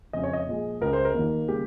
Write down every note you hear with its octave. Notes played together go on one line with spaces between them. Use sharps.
F2 C#3 G#3 D#5
C#5
D#5
A#2 F3 G#3
C#2 C#3 G#3 A#4
C5
A#4
D#2 D#3 A#3
C#3 G3 A#3 G4